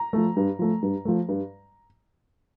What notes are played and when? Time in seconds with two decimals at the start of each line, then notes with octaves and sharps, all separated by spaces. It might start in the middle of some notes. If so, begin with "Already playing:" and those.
Already playing: A#5
0.13 F3 A3
0.37 G2
0.59 F3 A3
0.82 G2
1.05 F3 A3
1.29 G2